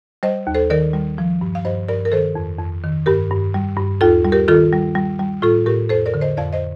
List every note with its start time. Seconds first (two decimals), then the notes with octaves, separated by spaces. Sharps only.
0.23 G3 C5 D#5
0.47 D#2
0.54 A4 C5
0.70 D#3 A#4 D5
0.94 G3
1.18 F3
1.41 G2
1.55 F5
1.65 G2 C5 D#5
1.88 G2 A#4 D5
2.05 A#4
2.12 D#3 A4 C5
2.35 F2
2.59 F2
2.84 D#3
3.06 G2 G4 A#4
3.31 G2
3.54 G3
3.77 G2
4.01 D#2 F4 A4
4.25 G3
4.32 G4 A#4
4.48 D#3 F4 A4
4.73 G3
4.95 G3
5.19 G3
5.42 A2 F4 A4
5.66 A2 G4 A#4
5.89 F2 A4 C5
6.06 A#4 D5
6.14 D3
6.21 C5 D#5
6.37 F2 D5 F5
6.53 C5 D#5